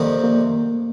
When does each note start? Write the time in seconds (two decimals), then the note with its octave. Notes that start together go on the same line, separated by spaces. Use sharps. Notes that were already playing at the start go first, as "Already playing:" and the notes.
Already playing: F2 C3 D#3 G3 A#3 C4
0.24 A#3